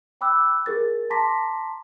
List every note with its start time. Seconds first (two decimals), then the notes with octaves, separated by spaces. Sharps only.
0.21 G5 B5 D6 E6 F#6
0.66 G#4 A#4 A6
1.10 A5 A#5 C6 D6 A#6 B6